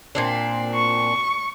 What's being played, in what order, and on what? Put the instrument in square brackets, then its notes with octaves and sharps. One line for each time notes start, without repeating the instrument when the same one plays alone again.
[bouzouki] A#2 C4 D4
[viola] C#6